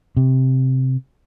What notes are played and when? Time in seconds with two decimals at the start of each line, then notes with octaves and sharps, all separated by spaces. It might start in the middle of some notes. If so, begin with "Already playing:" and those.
0.17 C3